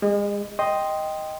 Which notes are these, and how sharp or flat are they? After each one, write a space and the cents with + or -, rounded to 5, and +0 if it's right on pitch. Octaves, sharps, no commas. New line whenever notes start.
G#3 -35 D#5 +0
D#5 +5 G5 +0 C6 +0